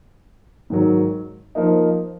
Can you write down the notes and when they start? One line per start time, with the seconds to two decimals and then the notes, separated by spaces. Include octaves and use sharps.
0.70 G#2 D#3 F#3
1.55 F3 A#3 D#4